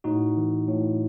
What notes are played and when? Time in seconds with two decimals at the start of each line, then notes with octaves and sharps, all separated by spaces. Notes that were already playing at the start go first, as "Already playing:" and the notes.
0.04 A2 D#4 F#4
0.37 E3
0.68 A2